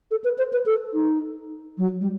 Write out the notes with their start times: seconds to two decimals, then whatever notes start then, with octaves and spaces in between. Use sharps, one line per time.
0.11 A4
0.24 B4
0.38 C5
0.53 B4
0.66 A4
0.94 D#4
1.78 F#3
2.01 G3